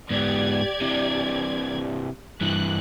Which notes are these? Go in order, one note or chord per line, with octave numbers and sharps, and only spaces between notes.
G#2 B3 G4 D5 G#6
C3 E3
G2 E3 F#6